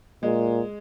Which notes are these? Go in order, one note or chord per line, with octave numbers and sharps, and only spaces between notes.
A#2 G#3